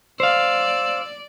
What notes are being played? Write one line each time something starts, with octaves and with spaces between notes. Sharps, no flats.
C5 D5 F5 E6